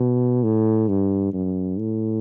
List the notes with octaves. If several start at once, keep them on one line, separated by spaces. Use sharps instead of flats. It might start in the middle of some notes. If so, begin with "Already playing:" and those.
Already playing: B2
A2
G2
F#2
A2